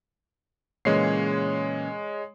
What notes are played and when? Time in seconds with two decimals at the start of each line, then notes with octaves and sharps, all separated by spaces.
0.85 A#2 C#3 E3 G#3 C#5 C7